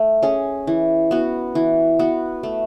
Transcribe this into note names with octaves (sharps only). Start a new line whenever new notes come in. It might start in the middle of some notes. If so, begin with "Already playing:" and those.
Already playing: A3
C#4 G#4
E3
B3 F#4
E3
B3 F#4
A3